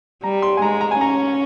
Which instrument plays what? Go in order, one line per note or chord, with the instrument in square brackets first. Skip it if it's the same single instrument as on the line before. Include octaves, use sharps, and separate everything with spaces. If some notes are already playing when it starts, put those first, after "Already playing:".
[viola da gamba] G3 [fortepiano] A#5
[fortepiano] C6
G#5
[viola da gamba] G#3 [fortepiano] A#5
[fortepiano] A#5
G#5
[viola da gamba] C#4 [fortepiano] A#5